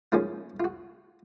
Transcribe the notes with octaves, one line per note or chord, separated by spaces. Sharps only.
G#2 F3 A#3 C#4 F4
F4
F#4